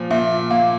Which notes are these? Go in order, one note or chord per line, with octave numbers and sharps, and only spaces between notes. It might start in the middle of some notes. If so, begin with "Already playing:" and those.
Already playing: A#2 F3
A#2 E5
A#3 F5